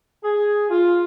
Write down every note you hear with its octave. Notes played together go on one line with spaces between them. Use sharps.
G#4
F4